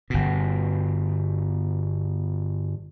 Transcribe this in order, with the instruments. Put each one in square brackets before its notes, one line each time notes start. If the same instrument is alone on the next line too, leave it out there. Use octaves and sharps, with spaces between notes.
[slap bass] G1 B2